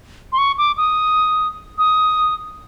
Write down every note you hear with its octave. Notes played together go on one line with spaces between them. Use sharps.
C6
C#6
D6
D#6
D#6